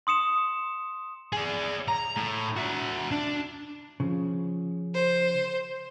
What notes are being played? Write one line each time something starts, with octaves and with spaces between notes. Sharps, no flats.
C6 D#6 C#7 E7
G#4 D5
A#5
A2
F#4 E5
D4
C#3 F3
C5